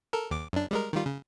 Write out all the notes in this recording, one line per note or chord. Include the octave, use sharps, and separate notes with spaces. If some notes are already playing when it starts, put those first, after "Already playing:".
A4 A#4
D#2 D6
F#2 D4
G3 G#3 A#4
D#3 G3 F4
C#3